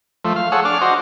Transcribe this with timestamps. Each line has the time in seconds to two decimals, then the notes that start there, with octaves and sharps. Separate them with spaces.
0.25 F3 A3
0.36 F5
0.52 G#4 A4 C#5 F#5
0.65 D4 D6 F6
0.81 F#4 C5 D#5